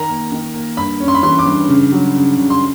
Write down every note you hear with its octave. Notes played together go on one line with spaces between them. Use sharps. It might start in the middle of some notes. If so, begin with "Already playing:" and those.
Already playing: D#3 A#5
A#3
D#3
A#3
G2 B5
C#4
C6
B5
E3 C6
D6
G2
C#3
F#3
C#3
C#3
C6